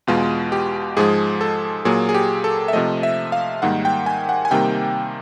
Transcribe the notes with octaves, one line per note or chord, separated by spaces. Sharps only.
E2 B2 G#3 F4
G4
G#2 F3 G#3 G#4
A4
A#2 F#3 A#3 G#4
G#4
G4
A4
E5
C3 F3 A3 D#5
E5
F5
G#2 D#3 G3 A#3 F#5
G5
G#5
F#5
G#5
C3 D#3 G3 A#3 G5